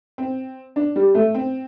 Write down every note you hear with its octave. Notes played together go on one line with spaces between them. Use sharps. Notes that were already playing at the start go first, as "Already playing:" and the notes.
C4
D4
G3
A3
C4